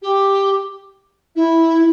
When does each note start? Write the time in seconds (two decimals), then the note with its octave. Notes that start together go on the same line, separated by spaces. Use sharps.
0.01 G4
1.35 E4